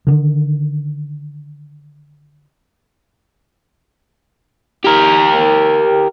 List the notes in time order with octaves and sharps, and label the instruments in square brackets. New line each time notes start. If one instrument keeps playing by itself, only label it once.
[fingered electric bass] D3 D#3
[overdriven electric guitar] G4 A#4